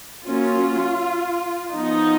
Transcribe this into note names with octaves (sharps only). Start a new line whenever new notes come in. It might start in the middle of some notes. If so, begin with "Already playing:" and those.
F#3 A#3 C#4 F4
F3 B3 D#4